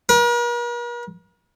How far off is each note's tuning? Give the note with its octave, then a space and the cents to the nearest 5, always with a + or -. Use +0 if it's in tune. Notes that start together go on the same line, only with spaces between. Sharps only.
A#4 +45